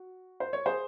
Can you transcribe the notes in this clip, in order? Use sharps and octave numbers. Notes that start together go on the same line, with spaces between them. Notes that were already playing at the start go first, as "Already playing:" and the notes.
Already playing: F#4
C5
C#5
G#4 C5